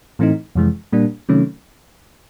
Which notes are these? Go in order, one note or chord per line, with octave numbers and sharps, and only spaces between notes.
A2 E3 A3 C4 D#4
F2 C3 E3 G#3
A#2 G3 A#3 D4
C3 D#3 F#3 A3 C#4